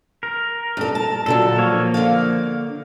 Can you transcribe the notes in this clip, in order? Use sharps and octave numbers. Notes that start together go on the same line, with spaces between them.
A#4
G2 A4
A5
A#2 D3 F#3 A4
F3 A#3 C#5
D3 F5